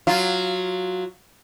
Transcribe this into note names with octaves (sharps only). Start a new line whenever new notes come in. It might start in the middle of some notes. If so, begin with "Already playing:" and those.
F#3 F4